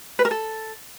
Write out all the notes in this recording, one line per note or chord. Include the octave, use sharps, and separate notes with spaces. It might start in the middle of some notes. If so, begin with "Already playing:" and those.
B4
A#4
A4